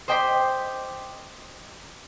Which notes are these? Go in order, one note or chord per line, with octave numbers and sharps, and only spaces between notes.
C5 D#5 G5 C6 D6 B6